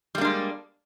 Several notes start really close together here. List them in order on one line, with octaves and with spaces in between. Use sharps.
G3 A#3 D4 G#3